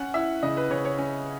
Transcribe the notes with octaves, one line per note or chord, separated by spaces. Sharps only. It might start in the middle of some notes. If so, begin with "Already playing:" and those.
Already playing: C#4 F#5
E4 E5
C#3 D#5
B4
C#3 C#5
C#5
C#4